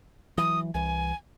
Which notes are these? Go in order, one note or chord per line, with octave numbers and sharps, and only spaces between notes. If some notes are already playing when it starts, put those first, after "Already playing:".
E3 F#3 D#6
C2 E3 G#5